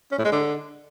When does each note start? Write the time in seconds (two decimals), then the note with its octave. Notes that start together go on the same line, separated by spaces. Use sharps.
0.12 C#4
0.19 A2
0.25 G#3
0.32 D3